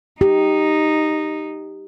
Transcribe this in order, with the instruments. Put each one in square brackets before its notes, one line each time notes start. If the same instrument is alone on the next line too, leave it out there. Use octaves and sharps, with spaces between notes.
[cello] D#4 [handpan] G4